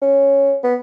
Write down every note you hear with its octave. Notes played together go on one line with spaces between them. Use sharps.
C#4
B3